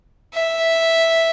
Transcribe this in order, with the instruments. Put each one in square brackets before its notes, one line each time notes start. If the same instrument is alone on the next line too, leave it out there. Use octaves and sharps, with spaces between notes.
[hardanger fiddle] E5